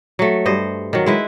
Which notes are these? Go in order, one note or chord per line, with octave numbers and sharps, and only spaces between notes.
F#3 A3
G2 C5 D#5
D#3 F#3
G#3 E4 B4